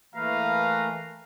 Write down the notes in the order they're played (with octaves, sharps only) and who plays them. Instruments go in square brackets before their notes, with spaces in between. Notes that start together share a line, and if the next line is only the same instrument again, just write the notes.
[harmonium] E3 A3 A#3 [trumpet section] B4 F5 A#5